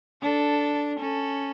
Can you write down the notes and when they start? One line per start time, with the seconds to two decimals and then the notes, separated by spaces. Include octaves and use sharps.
0.22 D4 A4
0.99 C#4 A4